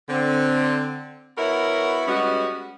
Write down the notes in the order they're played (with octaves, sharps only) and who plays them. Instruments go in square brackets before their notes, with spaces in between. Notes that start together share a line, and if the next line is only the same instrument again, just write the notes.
[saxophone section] D3 C4
B3 E4 F#4 A#4 C#5
G3 G#3 B3 C#4 F#4